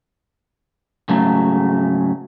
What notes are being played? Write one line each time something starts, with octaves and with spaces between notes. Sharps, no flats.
G#2 C#3 F#3 A3